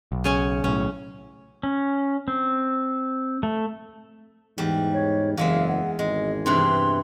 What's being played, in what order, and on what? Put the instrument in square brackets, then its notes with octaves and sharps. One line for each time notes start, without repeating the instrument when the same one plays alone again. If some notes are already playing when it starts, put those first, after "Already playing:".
[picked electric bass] B1
[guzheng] C#3 C#4 G#5
[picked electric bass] B1 A2 [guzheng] C#4
[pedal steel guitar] C#4
C4
A3
[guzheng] E2 G3 [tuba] G#2
[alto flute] C#5
[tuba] F#1 [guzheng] E2 G#3 E5 [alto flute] F5
[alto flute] F#5
[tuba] G#1 [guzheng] G#3 [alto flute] D#5
[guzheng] G2 C3 E3 [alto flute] C6